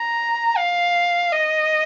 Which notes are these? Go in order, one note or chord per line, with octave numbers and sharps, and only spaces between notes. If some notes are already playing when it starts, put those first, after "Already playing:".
Already playing: A#5
F5
D#5